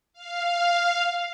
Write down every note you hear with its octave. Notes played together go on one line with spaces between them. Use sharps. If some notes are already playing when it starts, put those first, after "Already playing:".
F5